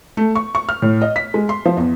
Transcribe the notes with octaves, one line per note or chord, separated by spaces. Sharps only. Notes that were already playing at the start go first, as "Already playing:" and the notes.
A3
C#6
C#6
F6
A2
D#5
B6
G#3
C6
F3
E2